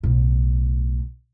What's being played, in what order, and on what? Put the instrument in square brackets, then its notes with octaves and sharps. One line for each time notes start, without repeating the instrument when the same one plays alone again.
[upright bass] B1 A2